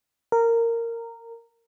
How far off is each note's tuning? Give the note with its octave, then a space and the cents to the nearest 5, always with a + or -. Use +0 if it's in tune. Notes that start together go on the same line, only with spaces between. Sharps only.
A#4 -15